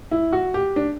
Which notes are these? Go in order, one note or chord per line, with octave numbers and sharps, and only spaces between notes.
E4
F#4
G4
D4